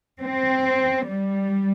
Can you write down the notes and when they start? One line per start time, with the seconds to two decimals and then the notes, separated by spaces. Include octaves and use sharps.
0.22 C4
1.08 G3